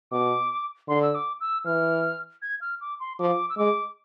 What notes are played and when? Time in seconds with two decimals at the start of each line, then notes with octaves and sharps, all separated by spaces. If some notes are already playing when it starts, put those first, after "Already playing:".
0.11 B2 D6
0.88 D3 C6
1.02 E6
1.15 D6
1.40 E6
1.65 E3 F6
2.42 G#6
2.61 F6
2.81 D6
3.00 C6
3.19 F3 D6
3.50 E6
3.58 G#3 D6